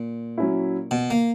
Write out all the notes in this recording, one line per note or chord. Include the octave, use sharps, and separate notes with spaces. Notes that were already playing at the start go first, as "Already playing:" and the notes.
Already playing: A#2
F#3 C#4 E4
B2
A#3